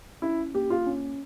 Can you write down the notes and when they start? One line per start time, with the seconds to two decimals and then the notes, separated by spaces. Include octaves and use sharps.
0.22 C#4 E4
0.54 A#3 G4
0.70 F4
0.86 C#4